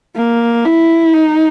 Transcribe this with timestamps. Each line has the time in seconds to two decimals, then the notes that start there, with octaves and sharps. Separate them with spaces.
0.16 A#3
0.65 E4
1.14 D#4